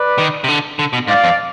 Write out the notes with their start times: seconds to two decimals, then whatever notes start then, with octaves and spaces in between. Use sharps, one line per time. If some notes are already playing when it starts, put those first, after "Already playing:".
Already playing: B4 D5
0.18 D#3
0.44 C3
0.48 D3
0.79 D3
0.93 B2
1.08 G#2 D5 F5
1.24 F2